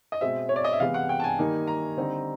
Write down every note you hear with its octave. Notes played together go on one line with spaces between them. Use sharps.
D#5
B2 G#3 C4 E5
C#5
D5
D#5
E5
C3 E3 G#3 B3 F5
F#5
G5
A5
G#5
D#3 G3 A#3 D#4
A#5
D3 G3 C4 D#4